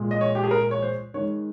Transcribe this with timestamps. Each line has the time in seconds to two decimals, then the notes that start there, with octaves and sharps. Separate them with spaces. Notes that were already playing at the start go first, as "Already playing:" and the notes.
Already playing: A#2 G#3
0.11 D#5
0.21 C#5
0.35 G4
0.44 G#4
0.51 A#4
0.71 C#5
0.82 C5
1.14 D#3 G#3 C#5